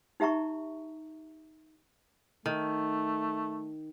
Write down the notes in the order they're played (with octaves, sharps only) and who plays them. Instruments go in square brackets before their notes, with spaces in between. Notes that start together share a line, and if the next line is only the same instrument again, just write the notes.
[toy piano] D#4 G4 E5 A#5 C#6
[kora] D#3 [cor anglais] A3